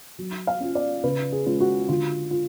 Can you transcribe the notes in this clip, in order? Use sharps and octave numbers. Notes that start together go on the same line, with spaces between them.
F#3
F5
C#4 F4
D5
C#3 B4
G#4
G#3 C#4 F4
F#4
D3 F4
F4